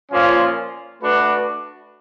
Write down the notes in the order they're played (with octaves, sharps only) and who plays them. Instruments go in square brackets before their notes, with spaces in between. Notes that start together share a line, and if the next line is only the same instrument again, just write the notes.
[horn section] A#2 F3 A#3 C#4 F4
A3 D4 F#4 B4